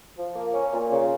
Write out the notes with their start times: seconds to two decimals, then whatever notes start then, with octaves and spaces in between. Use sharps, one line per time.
0.18 F3
0.36 A#3
0.54 C#4
0.73 A#2
0.92 C#3